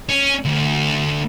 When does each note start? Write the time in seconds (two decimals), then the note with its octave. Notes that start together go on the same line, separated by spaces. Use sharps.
0.09 C#4
0.45 D2